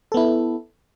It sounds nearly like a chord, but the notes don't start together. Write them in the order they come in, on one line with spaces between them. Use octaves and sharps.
A4 B3 E4